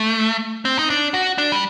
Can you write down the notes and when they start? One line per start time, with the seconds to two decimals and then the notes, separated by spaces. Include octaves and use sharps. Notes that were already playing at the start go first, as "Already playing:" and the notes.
Already playing: A3
0.65 C4
0.79 D#4
0.90 D4
1.14 F#4
1.38 D4
1.52 G3